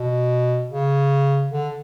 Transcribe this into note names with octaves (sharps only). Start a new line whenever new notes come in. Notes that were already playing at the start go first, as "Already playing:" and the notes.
Already playing: B2
C#3
D3